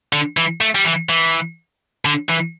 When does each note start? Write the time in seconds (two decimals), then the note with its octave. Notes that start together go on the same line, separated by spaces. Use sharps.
0.13 D3
0.37 E3
0.61 A3
0.75 G3
0.85 E3
1.09 E3
2.05 D3
2.29 E3